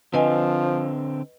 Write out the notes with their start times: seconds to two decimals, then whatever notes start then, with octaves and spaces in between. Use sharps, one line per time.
0.14 D3 F3 C4 B4 D#5 G#5